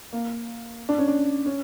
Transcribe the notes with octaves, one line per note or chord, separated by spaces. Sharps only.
A#3
D4
C#4
D4
C#4